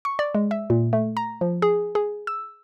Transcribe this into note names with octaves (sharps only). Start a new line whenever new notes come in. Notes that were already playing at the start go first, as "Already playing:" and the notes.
C#6
D5
G#3
E5
A#2
A3
A#5
F3
G#4
G#4
E6